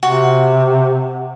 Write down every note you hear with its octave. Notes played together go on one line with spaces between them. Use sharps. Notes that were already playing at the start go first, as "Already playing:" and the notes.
C3 F#4